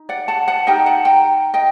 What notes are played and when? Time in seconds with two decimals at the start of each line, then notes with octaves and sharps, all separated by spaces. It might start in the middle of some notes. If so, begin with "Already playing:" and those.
Already playing: D#4
0.09 D5 F#5
0.28 F#5 A5
0.48 F#5 A5
0.67 D#4 G4 A#4 D#5 G5
0.86 F#5 A5
1.05 G5 A#5
1.54 D#5 G5